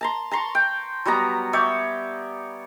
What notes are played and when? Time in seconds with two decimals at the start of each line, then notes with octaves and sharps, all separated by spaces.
0.01 A5 A#5 C6
0.31 A5 A#5 C6 C#6
0.55 G5
1.05 F#3 G3 B3 A#5
1.53 C#5 D5 E5 G5